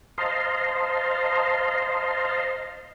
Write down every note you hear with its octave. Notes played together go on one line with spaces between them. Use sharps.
C5 D#5 F5 A5 A#5 C6